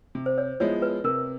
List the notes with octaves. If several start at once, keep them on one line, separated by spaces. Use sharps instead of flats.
C3
C5
C#5
F3 G#3 B3 E4 C#5
B4
C3 A#4